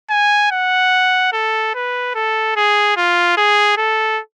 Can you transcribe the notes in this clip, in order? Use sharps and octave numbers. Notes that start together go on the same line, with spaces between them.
G#5
F#5
A4
B4
A4
G#4
F4
G#4
A4